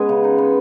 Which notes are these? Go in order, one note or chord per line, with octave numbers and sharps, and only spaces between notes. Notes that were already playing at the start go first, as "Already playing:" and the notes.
Already playing: G#3 B3 C#4 G#4 B4
C#3
D#4
B3